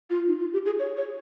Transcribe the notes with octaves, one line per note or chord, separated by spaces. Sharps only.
F4
D#4
F4
G4
G#4
C#5
C#5